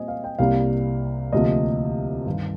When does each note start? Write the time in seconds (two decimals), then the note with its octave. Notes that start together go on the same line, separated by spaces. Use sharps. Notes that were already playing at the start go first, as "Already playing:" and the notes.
Already playing: A#2 G3 C4 D#5 G#5
0.08 F5
0.24 G5
0.39 C2 C3 G3 A#3 F5
1.32 D2 C3 F3 A#3 D#5
2.26 G2 D#3 G3 F5